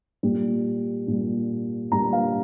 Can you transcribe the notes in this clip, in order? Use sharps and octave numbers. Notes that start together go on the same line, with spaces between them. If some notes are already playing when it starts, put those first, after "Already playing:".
A#2 G3
A#2 G3
A#2 G3 A#5
F5